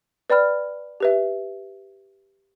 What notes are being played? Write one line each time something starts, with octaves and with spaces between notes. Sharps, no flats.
B4 D5 G5 B5 F6
G4 B4 E5